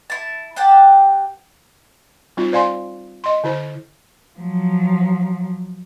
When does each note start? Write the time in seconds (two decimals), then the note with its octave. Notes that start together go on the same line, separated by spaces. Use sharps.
0.10 E4 A5
0.56 G4 F#5 G5 A5
2.37 G3 C4 D#4 F4
2.52 C5 D5 F5 G#5 C6
3.24 D#5 C6
3.44 D3 E4 C5
4.39 F3 F#3